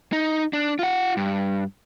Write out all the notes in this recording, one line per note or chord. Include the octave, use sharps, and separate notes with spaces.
D#4
D4
F4 F#5
G2